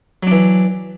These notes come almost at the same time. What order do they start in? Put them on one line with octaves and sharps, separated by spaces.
F#3 D4 E3